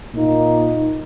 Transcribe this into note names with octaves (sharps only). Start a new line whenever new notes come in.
A#2 A#3 D#4